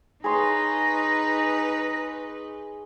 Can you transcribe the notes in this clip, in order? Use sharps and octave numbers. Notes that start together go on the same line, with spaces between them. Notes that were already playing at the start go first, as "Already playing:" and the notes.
D#4 G#4 B4 C#5 A#5 C6